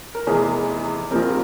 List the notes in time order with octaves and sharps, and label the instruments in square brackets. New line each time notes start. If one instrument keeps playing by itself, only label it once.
[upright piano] A#4
F1 E2 E3 G#4
A#1 A#2 G3 C4 A#4